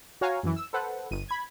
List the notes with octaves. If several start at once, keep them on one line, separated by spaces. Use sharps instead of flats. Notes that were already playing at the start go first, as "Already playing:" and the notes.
F#4 C#5 F5 G#5 A#5
F#2 E3
E6
A4 B4 C5 F#5
G1 D#7
B5 G#6